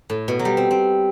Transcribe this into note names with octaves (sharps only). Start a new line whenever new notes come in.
A2
B2
F#3
G3
C4
C4